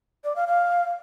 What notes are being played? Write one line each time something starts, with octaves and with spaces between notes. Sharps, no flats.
D5
F5
F5